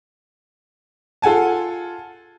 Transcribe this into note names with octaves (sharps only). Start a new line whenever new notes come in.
F4 A4 F#5 G#5 A5